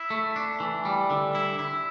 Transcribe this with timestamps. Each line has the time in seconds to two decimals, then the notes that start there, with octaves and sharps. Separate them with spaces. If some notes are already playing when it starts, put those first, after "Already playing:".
Already playing: E4
0.10 A3
0.36 D4
0.60 E3
0.85 G3
1.10 D3
1.35 E4
1.59 E4